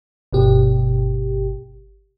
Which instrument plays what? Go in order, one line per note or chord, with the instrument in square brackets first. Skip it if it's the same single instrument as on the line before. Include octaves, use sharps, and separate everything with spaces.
[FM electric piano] G1 B2 G4